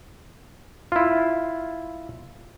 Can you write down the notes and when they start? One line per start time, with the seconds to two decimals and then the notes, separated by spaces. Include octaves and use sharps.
0.92 E4 F4